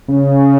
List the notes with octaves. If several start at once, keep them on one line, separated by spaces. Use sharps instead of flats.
C#3